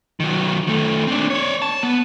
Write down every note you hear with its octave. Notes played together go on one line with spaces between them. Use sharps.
D#3 F#3
D#3 A3
C4 D4
C#5 D5
A5
B3